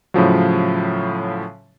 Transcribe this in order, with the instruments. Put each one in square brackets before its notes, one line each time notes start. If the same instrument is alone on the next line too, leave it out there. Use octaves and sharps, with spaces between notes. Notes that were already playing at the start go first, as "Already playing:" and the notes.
[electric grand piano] A2 C#3 F3 F#3